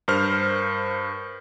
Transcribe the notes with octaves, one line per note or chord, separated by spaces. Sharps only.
G2 A#4 C5 F6